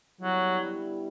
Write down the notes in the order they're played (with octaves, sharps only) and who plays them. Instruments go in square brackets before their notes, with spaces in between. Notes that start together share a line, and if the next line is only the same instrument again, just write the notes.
[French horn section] D3 G3 B3 E4 [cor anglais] F#3